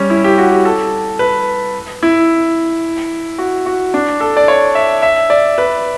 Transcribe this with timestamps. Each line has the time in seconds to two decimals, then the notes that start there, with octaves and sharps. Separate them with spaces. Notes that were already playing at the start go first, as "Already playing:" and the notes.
Already playing: G3 C#4
0.10 E4
0.24 G4
0.38 F#4
0.51 G4
0.65 A4
1.19 B4
2.03 E4
3.38 F#4
3.66 F#4
3.94 D4
4.20 A4
4.37 D5
4.48 C#5
4.75 E5
5.02 E5
5.30 D5
5.58 B4